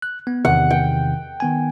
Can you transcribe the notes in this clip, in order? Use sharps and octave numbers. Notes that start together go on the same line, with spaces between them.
F#6
B3
E2 C3 D#3 F#5
G5
D#3 B3 G#5